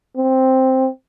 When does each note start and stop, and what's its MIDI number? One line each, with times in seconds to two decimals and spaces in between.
0.17 0.89 60